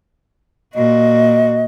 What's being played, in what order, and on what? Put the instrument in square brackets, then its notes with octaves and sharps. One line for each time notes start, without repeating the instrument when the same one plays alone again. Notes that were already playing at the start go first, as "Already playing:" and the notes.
[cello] A#2 F#4 [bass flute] D#5